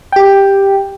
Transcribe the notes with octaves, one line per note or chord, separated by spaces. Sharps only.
G4 G5